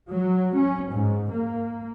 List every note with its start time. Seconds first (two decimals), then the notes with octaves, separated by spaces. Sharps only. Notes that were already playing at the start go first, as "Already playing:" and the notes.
0.10 F#3
0.54 C#4
0.89 G#2
1.31 A#3